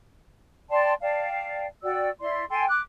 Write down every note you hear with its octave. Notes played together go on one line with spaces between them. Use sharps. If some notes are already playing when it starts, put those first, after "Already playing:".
D5 G5 A5 C6
D5 F5 G5 A5
F#4 D5 G5 E6
E4 D5 C6
A4 G5 G#5 C6
D6 F#6